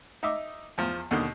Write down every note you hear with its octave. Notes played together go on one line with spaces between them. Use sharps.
D#4 D#5 E5 D6
E2 F3
D#2 B2 D3 D#3